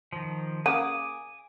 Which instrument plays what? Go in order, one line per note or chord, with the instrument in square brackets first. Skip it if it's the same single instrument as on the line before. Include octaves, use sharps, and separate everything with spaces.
[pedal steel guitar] D#3 F3
[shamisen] C#3 A#3 F#5 [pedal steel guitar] G#5 D6 D#6